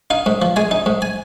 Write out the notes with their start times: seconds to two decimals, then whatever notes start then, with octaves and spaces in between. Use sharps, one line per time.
0.10 D#4 F5
0.26 G#2
0.42 F3
0.56 G#3 G#5
0.71 D#4
0.86 G#2
1.02 G#5